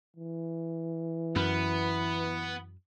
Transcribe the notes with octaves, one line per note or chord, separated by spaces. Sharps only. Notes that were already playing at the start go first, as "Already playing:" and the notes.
E3
F#2 B3